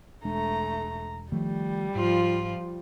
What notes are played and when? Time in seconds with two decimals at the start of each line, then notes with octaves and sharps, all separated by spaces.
0.25 E1 G#3 A3 D4 A#5
1.32 D#3 F3 G3 A3
1.95 G#2 F3 F4